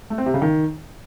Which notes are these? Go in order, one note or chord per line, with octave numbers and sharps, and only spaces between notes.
A3
C4
C3
C#3
D#3